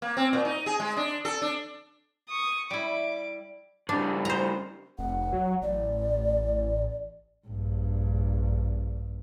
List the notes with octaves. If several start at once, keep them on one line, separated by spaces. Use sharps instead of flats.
A#3
C4
A#2
D#4
G#4
G#3
D4
A4
D4
C#6 D#6
G3 E4 D6
C#3 G3 D4
C5 A#5
F1 F#5
F#3
A1 D5
A#1 G2